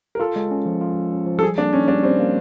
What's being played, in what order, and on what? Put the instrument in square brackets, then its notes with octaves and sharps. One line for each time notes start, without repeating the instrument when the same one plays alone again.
[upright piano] A#4
[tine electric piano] F4 [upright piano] A4
[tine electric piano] G#3
C#4
F3
F4
G#3
C#4
F3
[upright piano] A4
[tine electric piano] G3 [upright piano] G#4
[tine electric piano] A#3 [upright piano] D4
[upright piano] C#4 [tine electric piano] D#4
[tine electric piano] G3 [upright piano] D4
[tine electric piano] G3 [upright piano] C4
[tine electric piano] A#3